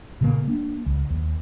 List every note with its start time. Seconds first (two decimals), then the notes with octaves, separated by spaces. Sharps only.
0.21 A#2 C#3 A#3
0.48 A#3 D4
0.86 C#2
1.10 D#2